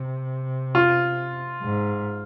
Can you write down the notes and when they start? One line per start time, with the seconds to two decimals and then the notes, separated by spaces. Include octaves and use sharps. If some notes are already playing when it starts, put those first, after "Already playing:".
Already playing: C3
0.75 F4
1.63 G#2